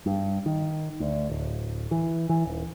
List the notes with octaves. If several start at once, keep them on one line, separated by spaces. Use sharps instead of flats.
G2
D#3
D2
D1
E3
E3
D#1